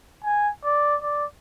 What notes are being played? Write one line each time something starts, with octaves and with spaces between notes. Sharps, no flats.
G#5
D5
D5